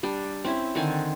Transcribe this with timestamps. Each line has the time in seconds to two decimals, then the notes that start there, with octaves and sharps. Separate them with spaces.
0.03 G3 D4
0.44 C4 C#4 E4
0.75 D3 D#3 C4 G#5